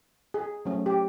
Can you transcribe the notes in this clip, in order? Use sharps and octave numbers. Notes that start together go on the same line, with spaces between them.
G#4
F#3 A3 C#4
G4